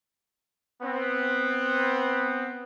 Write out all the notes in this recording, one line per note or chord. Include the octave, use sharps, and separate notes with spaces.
B3 C4